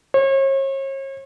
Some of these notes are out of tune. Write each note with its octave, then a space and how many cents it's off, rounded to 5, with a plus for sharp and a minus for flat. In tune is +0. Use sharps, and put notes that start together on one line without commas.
C#5 -40